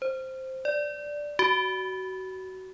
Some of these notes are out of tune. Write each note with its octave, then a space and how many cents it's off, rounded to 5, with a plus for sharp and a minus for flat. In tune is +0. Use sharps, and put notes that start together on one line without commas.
C5 +5
D5 +0
F#4 +25